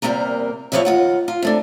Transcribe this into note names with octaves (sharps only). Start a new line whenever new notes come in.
E2 G#2 C3 G3 A#3 A#4
E2 E3 F3 F4 C#5 E5
D#2 F4 F#5
F4
C3 A3 D4